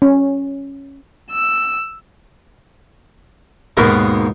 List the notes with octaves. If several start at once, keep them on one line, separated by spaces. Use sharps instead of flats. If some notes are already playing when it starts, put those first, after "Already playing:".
C#4
E6
D#2 G#2 B2 G#4 A#4 A#5